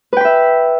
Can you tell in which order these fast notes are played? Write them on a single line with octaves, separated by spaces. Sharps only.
B4 G5 B5 E5